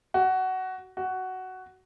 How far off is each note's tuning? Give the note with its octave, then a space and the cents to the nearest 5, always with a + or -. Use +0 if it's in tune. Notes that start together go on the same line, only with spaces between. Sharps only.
F#4 +15
F#4 +10